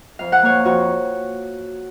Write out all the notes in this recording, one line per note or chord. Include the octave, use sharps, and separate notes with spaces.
F2 F5
F#5
A#3 C#5 F5
F2 F#4